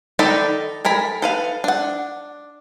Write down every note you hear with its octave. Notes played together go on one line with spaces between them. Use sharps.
D#3 D#4 A4 D5 B5
A4 A#4 G#5 B5
A4 B4 F5
D4 F#5